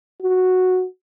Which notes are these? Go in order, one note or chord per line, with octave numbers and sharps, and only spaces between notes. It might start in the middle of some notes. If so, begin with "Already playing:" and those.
F#4